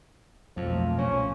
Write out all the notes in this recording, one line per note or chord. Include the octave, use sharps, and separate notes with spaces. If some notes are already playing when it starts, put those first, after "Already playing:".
B1 F2 F3 A3 A#3
C2 A#2 C#4